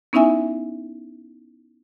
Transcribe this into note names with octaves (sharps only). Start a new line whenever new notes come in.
B3 C#4 D#4 E4 E5 G#5